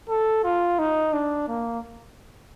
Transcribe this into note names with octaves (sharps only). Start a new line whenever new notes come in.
A4
F4
D#4
D4
A#3